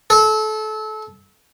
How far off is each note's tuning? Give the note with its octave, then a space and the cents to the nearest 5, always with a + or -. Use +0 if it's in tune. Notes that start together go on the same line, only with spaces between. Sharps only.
A4 -30